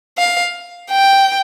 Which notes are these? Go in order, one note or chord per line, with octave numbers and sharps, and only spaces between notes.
F5
G5